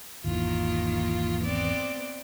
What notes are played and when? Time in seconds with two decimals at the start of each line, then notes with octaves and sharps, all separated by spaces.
0.24 G#1 E2 D#3 E3 A#3 F4
1.44 B3 C4 D5